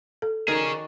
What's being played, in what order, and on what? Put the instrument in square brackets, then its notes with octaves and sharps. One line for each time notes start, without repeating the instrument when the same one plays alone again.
[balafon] A4
[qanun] D#3 F#4 D5 [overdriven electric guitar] G#4 C#5 [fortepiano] A#4